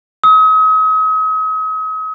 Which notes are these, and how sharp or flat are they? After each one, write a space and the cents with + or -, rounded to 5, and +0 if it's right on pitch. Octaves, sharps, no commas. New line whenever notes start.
D#6 +40